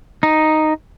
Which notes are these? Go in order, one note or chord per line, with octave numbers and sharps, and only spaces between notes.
D#4